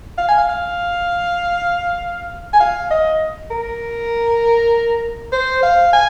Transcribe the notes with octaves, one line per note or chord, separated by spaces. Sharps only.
F5
G#5
F5
F5
G#5
F5
D#5
A#4
C5
F5
G#5